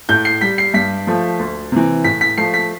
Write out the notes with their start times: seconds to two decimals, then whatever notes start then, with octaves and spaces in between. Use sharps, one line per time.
0.09 A2 G6
0.25 C7
0.41 G3 B6
0.58 C7
0.74 G2 B6
1.07 F3 A3
1.39 D2
1.72 C3 E3
2.04 A2 B6
2.21 B6
2.37 F3 A3 C7
2.54 B6